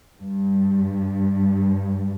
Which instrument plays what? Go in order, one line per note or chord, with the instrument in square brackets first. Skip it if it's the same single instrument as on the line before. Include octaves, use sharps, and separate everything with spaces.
[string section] G2